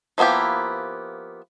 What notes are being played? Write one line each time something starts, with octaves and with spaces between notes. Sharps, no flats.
F3 A#3 B3 E4 G4